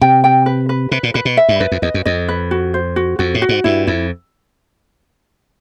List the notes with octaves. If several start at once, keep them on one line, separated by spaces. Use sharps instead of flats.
C3 G5
G5
B4
B4
C3 B4
A#2
A#2 B4
B2
E5
G2
F#2 B4
F2
E2 D#5
F#2
F2 D#5
B4
F#4
C5
F#4
F2 F#4
A2
F#4
G#2
G2 E4
F2 E4